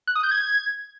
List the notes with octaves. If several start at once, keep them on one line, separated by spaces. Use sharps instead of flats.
F#6
D#6
G6
G#6